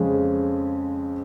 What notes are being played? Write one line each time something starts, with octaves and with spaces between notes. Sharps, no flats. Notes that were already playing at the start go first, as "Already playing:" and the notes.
Already playing: F2 C#3 G#3